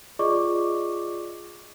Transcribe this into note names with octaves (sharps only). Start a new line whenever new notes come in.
F4 G#4 D5 D#5 C#6 D6